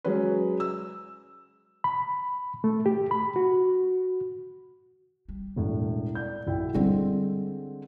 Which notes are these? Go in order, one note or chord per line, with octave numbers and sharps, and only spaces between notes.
F#3 G#3 C#4 B4
E6
B5
A3
G4
B5
F#4
G3
E1 E2 A2
D5 G6
B1 E4 G5
D3 G3 G#3 C4 E4